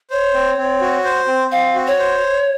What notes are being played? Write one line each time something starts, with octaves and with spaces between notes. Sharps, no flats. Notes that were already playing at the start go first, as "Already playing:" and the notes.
C5 C#5
C4
C4
F#4
C5
C4
C4 F5
F#4
C#5
C5